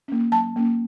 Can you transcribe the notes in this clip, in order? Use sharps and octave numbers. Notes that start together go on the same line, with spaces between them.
A#3 C#4
F#3 A5
A#3 C#4